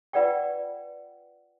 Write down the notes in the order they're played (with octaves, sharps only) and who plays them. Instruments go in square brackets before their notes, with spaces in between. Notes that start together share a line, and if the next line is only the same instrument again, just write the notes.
[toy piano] F4 B4 D5 F#5 G5